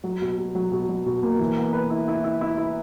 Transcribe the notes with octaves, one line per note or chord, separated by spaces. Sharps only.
F#3
B2
B2
F#3
B2
F#3
B2
A#3
E3
B3
B4
E4
E4
E4
E4
E4